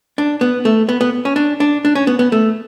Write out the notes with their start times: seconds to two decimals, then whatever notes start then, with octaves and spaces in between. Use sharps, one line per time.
0.18 D4
0.41 B3
0.65 A3
0.89 B3
1.01 B3
1.25 C#4
1.36 D4
1.60 D4
1.85 D4
1.95 C#4
2.07 B3
2.19 B3
2.32 A3